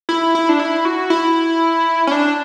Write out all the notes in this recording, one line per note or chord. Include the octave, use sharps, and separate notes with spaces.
E4
E4
D4
E4
F#4
E4
C#4
D4